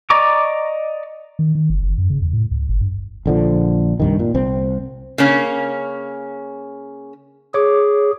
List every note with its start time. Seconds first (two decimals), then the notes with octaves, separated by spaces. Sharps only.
0.10 D5 D#5 A#5 C#6 D6
1.39 D#3
1.55 D#3
1.70 F#1
1.83 F#1
1.98 F#2
2.10 C#3
2.22 E2
2.33 A2
2.51 C#2
2.69 G1
2.81 G2
3.26 A#1 D3 F3
4.00 C2 G2 D#3
4.19 A#2
4.34 C2 C4
5.18 C#3 A#3 C#4
7.54 G#4 C#5 D6